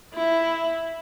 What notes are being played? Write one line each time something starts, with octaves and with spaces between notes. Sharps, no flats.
E4